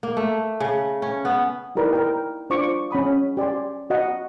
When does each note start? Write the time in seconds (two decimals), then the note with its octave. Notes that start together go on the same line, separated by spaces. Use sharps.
0.03 A#3
0.17 A3
0.60 C#3
1.02 C#4
1.25 B3
1.75 D#4 E4 G4 A#4 B4 D5
1.93 A#4 G5
2.50 D4 F4 C5 C#6 D6
2.91 C#4 F#5 B5 D#6
3.37 G4 D5 G#5 C6
3.90 F#4 D#5 F#5